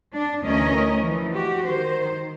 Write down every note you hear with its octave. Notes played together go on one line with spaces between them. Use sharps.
D4
D2 E3 C#4 A#4 D#5
E3 F3
F#4 G4
D#3 C5